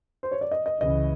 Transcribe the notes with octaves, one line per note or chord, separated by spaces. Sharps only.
C5
C#5
D5
D#5
D#5
C#2 C#3 E3 D#5